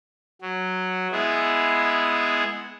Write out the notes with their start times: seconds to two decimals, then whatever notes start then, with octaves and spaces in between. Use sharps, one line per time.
0.42 F#3
1.11 G#3 B3 E4 G#4